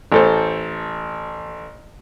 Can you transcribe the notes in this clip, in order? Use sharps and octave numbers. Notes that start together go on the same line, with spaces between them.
A1 A4 C5